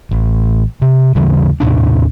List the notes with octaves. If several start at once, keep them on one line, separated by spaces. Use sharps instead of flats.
A1
C3
D#2 C#3 E3 G3
D#2 A2 C3 D4